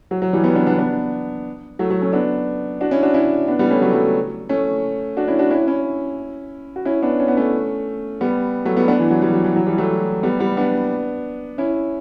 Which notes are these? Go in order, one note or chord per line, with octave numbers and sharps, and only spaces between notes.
F#3
F#3
E3 G3
G3 B3
B3 D4
B3 D4
B3 D4
F#3 A3
F#3 A3
A3 C#4
B3 D4
D4 F#4
C#4 E4
D4 F#4
C#4 E4
B3 D4
G3 B3
A3 C#4
F#3 A3
F#3 A3
A3 C#4
D4 F#4
C#4 E4
D4 F#4
C#4 E4
C#4 E4
F#4
C#4 E4
B3 D4
C#4
B3
A3 C#4
G3 B3
F#3 A3
G3 B3
B3 D4
E3
F#3
E3 G3
F#3
E3
F#3
E3 G3
F#3 A3
G3 B3
G3 B3
B3 D4
C#4 E4